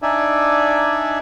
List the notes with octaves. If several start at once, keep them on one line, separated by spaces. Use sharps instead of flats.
D4 D#4 D5 E5 G#5